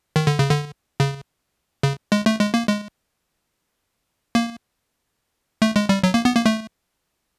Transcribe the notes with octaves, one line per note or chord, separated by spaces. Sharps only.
D#3
D3
C#3
D3
C#3
C#3
G#3
A3
G#3
A#3
G#3
A#3
A3
G#3
G3
F#3
A#3
B3
A#3
A3